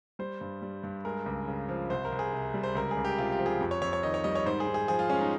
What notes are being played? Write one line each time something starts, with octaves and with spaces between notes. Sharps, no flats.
G3 C5
G2
G3
G2
G#3 A#4
C#2
C#3
F3
C2 C5
A#4
C2
G#4
C3
G3
C5
C#2 A#4
G#4
C#2
G4
C3 F4
G4
F3
G#4
F2
C#5
F2 C#5
C#5
D#3 D#5
C#5
G3 D#5
C#5
G#2 C5
G#4
G#2
G#4
F3 G#4
F4
G#3 C#4
D#4